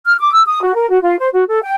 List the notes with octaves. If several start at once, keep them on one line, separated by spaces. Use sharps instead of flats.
F6
D6
E6
D#6
F#4
A#4
F#4
F4
C5
F#4
A4
G5